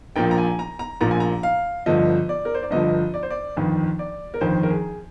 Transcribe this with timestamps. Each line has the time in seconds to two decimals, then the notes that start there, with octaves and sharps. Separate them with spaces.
0.16 A#1 A#2 F3 G5
0.31 A#5
0.38 G#5
0.59 A#5
0.79 A#5
1.01 A#1 A#2 F3 A#5
1.11 G#5
1.20 A#5
1.43 F5
1.86 G1 G2 D3 F3 D#5
2.29 D5
2.45 A#4
2.54 C5
2.63 D5
2.71 G1 G2 D3 F3 D#5
3.14 D5
3.23 C5
3.31 D5
3.57 G1 F2 D#3
3.99 D5
4.34 A#4
4.41 G1 F2 D#3 C5
4.63 A#4
4.70 G#4